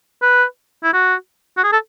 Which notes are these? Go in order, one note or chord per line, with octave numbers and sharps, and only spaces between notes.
B4
E4
F#4
F#4
G#4
A4